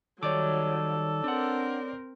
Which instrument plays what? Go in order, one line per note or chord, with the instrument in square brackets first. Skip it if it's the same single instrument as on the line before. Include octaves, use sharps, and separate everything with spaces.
[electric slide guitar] D#3 G3 D#4 [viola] F#3 [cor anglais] A4 [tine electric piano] C#5 D5 D6
[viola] C4 A#4 [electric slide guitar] D4 F#5